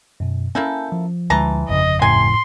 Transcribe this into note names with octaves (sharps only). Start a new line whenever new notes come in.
F#2 B2
A#3 C4 C#4 E4 A4 G#5 G6
F3
D2 E3 G#3 A5 A#5
G1 F2 C#3 D#5
A2 C3 G#5 C6